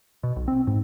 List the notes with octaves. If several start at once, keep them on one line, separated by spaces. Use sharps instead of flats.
B2
B1
C4
G#2